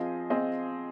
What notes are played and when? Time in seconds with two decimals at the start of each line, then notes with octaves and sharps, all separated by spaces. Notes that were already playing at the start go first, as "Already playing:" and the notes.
Already playing: F3 C4 F4 G#4 D#5
0.30 F3 C4 F4 G#4 D#5